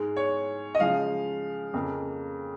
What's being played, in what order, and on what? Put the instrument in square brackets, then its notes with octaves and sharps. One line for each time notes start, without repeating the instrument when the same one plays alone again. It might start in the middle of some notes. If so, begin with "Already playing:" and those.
Already playing: [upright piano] G#2 G#3
C#5
D#5
C#3 F3 G#3 F5
F2 C#3 A#3